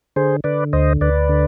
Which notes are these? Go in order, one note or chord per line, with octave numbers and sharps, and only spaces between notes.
D3 G#4 C5
D3 B4 D5
D2 C5 D#5
D2 B4 D5
D3